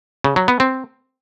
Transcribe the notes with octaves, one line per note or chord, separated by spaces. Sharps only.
C#3
F#3
B3
C4